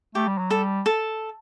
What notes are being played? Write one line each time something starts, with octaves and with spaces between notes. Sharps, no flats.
A3 G4
G3
F#3
G3 A4
A4